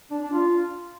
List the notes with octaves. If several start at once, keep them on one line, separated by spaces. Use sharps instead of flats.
D4
D4
F4